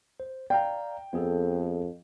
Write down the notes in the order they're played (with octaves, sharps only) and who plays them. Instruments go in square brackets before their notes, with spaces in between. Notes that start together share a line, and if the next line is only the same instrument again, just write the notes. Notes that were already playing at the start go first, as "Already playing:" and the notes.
[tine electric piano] C5
[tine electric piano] D5 F5 A#5 [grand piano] G5
[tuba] F2 [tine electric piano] B3 G#4 A4